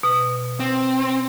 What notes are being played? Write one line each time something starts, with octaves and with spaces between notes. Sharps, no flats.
B2
C4